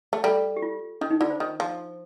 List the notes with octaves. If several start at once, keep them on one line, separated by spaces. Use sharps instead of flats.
A3
G3 A4
G4
F4
D#3 D4
D#4
D3 F4
C5
D#3
F3